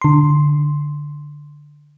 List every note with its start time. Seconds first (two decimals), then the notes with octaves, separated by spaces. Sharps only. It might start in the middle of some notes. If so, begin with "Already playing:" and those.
0.02 D3 C6